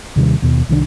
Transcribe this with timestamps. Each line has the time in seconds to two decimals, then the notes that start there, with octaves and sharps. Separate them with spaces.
0.16 D#2 C3 D#3 G3
0.42 D#2 B2
0.69 C2 D#3 G#3 D4